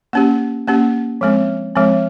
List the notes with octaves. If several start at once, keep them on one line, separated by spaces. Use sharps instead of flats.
A#3 C#4 G4
A#3 C#4 G4
F3 G#3 C4
F3 G#3 C4